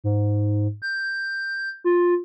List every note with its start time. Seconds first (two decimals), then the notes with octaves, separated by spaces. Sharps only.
0.04 G#2
0.82 G6
1.84 F4